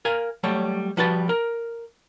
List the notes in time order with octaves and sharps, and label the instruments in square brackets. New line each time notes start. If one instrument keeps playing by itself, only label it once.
[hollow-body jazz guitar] A#4 F5 G#5
F#3 G3 A3 C#5
F3 G3 F#4 B4 D#5 A5
A#4